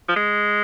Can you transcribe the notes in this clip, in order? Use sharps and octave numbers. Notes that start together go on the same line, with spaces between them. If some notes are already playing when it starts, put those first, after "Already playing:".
F3
G#3